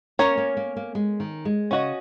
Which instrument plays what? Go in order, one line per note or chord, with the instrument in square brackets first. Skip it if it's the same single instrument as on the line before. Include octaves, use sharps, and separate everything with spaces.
[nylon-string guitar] A#3 [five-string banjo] C#4 A#4 C#5
[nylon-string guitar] A#3
A#3
A#3
G#3
D#3
G#3
[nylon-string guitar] C#3 [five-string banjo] C#4 F#4 D#5